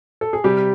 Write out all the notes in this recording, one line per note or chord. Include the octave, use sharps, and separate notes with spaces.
A4
G#4
C3 G3 G4